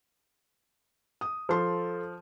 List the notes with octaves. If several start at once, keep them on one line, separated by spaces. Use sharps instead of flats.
D#6
F3 A4 C6